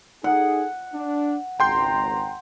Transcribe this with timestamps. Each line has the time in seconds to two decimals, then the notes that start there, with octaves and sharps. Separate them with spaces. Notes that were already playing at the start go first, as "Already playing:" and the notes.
0.24 D#4 G#4 A4 F#5
0.94 D4
1.60 G#1 C#2 G5 A#5 C6 G6